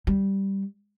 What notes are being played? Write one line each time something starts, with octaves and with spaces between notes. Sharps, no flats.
G3